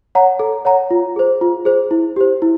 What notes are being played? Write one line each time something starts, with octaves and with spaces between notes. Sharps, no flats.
C#5 F#5 A#5
A4
C#5 F#5 A#5
F4
G#4 C5
F4
G#4 C5
E4
G4 C5
E4